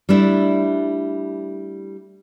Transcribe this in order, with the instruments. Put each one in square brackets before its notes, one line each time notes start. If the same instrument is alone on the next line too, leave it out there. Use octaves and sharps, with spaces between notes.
[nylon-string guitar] G3 A3 D4 E4